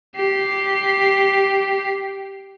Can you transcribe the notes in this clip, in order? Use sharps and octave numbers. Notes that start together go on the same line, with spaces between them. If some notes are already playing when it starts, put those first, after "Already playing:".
G4 C7